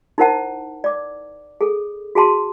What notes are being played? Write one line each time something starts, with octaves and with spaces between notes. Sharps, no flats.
D#4 E4 A#4 C5 F#5 A5
D5 D6
G#4 A4
F#4 G#4 A5 C6